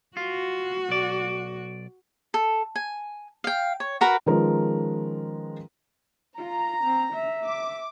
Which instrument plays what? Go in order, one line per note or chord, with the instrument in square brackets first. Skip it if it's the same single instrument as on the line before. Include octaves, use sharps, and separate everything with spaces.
[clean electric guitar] F4 [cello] F#4
[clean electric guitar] B1 D5
[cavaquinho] A4
G#5
F5 G5
C#5
F#4 A#4 B4
[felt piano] D#3 F3 G#3 C#4 A#4 B4
[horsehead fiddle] F4 [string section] A#5
[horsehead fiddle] C4
E5
[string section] D6